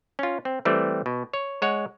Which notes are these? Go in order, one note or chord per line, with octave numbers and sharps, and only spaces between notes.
C#4 F4
C4
E3 G3 A3 C4
B2
C#5
G#3 C#5 F#5